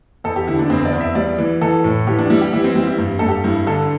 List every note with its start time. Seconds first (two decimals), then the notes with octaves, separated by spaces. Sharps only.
0.24 E2 A4
0.36 G4
0.47 D3 E4
0.59 D4
0.70 E2 C4
0.85 D5
0.93 E2
1.01 E5
1.15 G3 D5
1.38 E3
1.61 E3 A4
1.84 A2
2.07 E3 G4
2.19 D4
2.30 G3 E4
2.41 G4
2.53 E3 E4
2.64 C4
2.75 G3 C4
2.87 E4
2.98 G2
3.19 G2 A4
3.28 G4
3.44 G2 E4
3.67 D3 A4